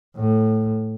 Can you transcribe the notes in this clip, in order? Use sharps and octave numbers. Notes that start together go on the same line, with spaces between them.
A2